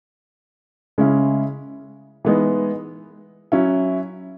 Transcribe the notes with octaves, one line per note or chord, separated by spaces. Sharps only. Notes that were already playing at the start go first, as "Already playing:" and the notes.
C#3 G#3 C#4 E4
E3 G#3 B3 D#4
F#3 C#4 E4